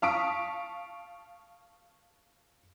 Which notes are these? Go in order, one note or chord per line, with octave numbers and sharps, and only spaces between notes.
F5 A5 C#6 D#6 B6 D7